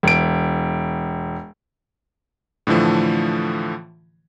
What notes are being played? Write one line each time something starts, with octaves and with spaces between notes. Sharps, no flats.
E1 D7
A2 D3 E3 F3 A3